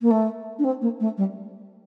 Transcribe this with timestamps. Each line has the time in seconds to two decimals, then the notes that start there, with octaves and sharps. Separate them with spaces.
0.01 A#3
0.10 A3
0.59 D4
0.64 C4
0.81 A#3
1.00 A3
1.17 G3